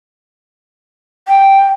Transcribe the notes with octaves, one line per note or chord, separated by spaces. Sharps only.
G5